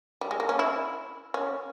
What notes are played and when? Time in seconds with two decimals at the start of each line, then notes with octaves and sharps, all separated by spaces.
0.21 G3
0.31 G#3
0.40 A#3
0.49 C#4
0.59 E4
1.34 C#4